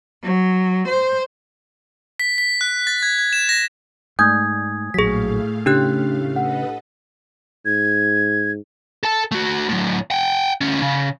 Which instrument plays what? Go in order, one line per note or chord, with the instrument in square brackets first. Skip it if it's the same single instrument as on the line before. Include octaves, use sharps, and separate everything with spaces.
[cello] F#3
C5
[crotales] B6
B6
F#6
A6
G#6
G#6
E7
A#6
[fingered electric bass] G#2 [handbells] A3 G6 [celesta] G#5 D#6 G#6
[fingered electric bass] A#1 F#3 [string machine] A2 A3 F5 [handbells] G#4 B6
[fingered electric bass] C#3 [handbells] D4 G4 F#6
[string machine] A4 B4 D#5 [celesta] F#5
[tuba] G#2 [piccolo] G#6
[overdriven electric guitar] A4 A5
A3 F#4
A2 F#3
F#5 G5
D2 C#4
C#3